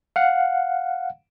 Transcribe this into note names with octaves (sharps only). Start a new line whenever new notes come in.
F5 F#5